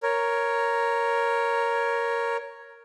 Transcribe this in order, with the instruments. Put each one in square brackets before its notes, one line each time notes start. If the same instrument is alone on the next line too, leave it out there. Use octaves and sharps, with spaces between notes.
[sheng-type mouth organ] A#4 C#5